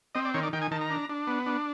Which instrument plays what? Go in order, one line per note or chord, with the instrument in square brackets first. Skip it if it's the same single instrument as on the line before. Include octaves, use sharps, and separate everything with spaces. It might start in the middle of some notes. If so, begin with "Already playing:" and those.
[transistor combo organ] C4 D#5
D5
D#3 C#5
D5
D#3 G5
G#5
D#3 A5
A#5
D4
D4
B3
D4